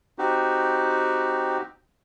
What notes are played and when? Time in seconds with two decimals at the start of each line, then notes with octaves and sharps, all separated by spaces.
0.18 C4 D#4 F#4 G4